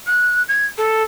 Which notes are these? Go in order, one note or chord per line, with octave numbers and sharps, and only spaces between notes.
F#6
G#6
A4